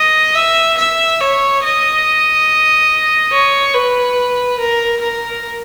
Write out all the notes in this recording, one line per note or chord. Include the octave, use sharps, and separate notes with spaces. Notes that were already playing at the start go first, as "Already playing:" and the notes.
Already playing: D#5
E5
E5
C#5
D#5
C#5
B4
A#4
A#4